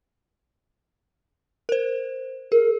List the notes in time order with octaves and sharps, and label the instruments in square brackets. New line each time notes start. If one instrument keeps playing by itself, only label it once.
[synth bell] A#4 C5
[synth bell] G#4 [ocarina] A#4